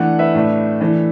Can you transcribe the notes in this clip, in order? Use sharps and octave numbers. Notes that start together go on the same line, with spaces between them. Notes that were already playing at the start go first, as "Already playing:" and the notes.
Already playing: E3 A3 D4 D5 F#5
B4 E5
A2 A3 D4
E3 A3 D4